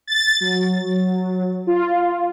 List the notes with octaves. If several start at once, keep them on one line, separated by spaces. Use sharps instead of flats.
A6
F#3
F4